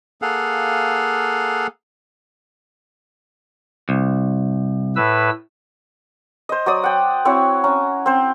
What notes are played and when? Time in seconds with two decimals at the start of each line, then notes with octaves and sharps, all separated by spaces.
0.22 A#3 G#4 A4 F5 F#5
3.89 C2
4.96 A2 B4 E6
6.49 C5 D#5
6.66 F#3 D5 D#6
6.83 F#5 G5
7.25 C4 E4 F#4 C#5
7.64 C#4 A#5
8.06 C4 C5